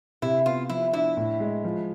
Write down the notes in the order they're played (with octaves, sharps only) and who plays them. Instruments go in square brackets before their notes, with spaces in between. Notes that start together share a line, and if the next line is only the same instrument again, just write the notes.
[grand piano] C3 [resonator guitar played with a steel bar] E4
[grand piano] B3 [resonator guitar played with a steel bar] F4
[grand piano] F3 [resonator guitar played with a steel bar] E4
[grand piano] D4 [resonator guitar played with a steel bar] E4
[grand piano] A2
G#3
F3